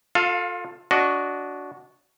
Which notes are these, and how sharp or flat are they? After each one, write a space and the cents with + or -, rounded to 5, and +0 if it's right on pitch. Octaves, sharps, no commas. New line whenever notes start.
F4 +25 A4 +10 F5 +0
D4 -20 F#4 +0 D#5 +0